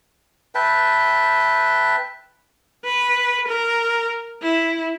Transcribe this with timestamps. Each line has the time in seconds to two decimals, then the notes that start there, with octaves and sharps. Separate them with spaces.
0.55 B4 E5 G5 A5
2.84 B4
3.47 A#4
4.42 E4